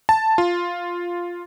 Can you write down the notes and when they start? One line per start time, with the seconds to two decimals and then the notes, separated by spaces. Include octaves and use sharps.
0.09 A5
0.38 F4